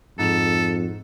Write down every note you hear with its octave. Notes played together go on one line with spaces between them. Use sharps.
F2 G#2 A4 E7